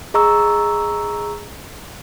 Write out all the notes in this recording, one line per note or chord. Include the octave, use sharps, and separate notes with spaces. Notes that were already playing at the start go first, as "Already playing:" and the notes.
G#4 D#5 A#5 C#6 E6